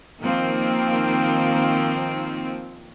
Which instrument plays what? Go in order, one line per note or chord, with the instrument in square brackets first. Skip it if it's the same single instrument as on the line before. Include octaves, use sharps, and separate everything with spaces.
[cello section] D#3 F3 A#3 C4